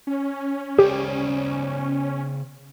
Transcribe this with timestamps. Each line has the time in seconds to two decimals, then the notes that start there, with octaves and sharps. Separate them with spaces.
0.07 C#4
0.79 C#3 G4 C5 D5